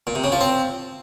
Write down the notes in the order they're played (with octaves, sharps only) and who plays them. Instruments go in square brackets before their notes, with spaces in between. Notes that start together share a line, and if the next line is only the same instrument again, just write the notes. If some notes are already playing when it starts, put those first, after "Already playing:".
[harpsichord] A#2
C3
C#3
F3
C4